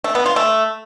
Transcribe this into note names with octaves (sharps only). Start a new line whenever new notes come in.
A3
B3
F4
A3